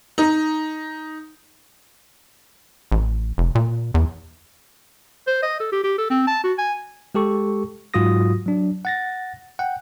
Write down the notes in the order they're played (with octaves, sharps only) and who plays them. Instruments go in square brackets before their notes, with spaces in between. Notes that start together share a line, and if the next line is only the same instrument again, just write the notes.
[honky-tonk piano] D#4
[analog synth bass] A1
F1
A#2
E2
[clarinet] C5
D#5
A4
G4
G4
A4
C4
A5
F#4
G#5
[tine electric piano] G#3 G4 A4 C#6
G#2 F#3 F4 F#4 D#6 A#6
F#3 D4
F#5 A6 A#6
F#5 G5